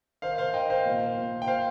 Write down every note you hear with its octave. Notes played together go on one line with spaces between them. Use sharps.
D#3 C5 F5
C5 F5
D#3 D#5 G5
C5 F5
A#2
A#2
G5
C5 F5